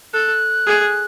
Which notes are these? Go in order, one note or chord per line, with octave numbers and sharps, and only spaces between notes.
A4 F#6
G#4